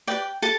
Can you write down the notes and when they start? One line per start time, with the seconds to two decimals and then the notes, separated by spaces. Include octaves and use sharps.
0.07 G4 B4 D5 G5
0.42 G4 A4 A5